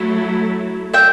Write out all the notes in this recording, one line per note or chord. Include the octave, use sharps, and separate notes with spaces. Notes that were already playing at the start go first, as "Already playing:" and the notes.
Already playing: F#3 A3 E4 A4
E5 G5